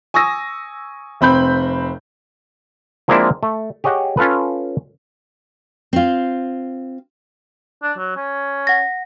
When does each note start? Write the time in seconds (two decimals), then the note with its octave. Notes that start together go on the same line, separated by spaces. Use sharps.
0.14 G#5 C#6 D#6 E6 A#6
1.21 F1 C4 B5 G6
3.08 F3 G#3 A#3 C4 D4 E4
3.43 A3
3.84 G4 G#4 C#5 D#5 F#5 G5
4.17 C#4 F4 A4 B4
5.93 C4 F4
7.83 D4
7.98 F#3
8.16 C#4
8.67 F#5 A#6